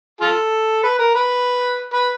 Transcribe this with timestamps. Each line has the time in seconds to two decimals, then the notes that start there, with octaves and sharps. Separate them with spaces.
0.21 F4 A4
0.83 B4
0.99 A#4
1.15 B4
1.93 B4